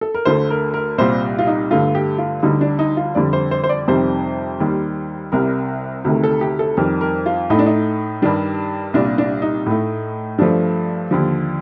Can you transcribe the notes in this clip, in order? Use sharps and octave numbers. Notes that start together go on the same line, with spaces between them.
A4
A#4
D2 D3 A3 C5
A#4
A#4
C2 A#2 G3 C5
F4
D#4
G2 D3 A3 F4
G4
F4
D2 D3 G3 D#4
D4
D#4
F4
F2 D3 G3 D5
C5
C5
C5
D5
F2 C3 D#3 G3 C5
D#2 D#3 G3
C2 C3 G3 A#4
D2 C3 D#3 A3
A4
G4
A4
F2 D#3 G3 A#4
A#4
F4
A2 A3 D#4
D4
D#4
G2 D#3 G3 D4
C2 A#2 G3 D4
D4
D#4
A2 A3
G2 F3 A3 D4
D#2 D3 F3